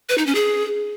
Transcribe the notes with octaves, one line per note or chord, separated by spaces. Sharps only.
B4
D#4
C#4
G#4